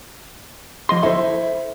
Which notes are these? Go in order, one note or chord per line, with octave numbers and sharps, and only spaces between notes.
F3 D#5 C6
E4 A4 C5